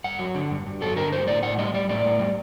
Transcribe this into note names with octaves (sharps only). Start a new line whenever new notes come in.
G2 F#5
F#3
D3
G2
G2
F#3 A4
D3 A#4
G2 C5
A2 D5
A2 F#5
G3 D#5
G3 D5
A2 D5
A2
G3